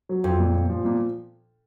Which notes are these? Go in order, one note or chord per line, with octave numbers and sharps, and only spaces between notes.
F#3
F2 F4
A#2
A#2
F3
A#2